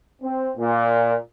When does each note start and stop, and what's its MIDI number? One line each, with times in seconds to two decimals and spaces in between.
0.22 0.51 60
0.56 1.16 46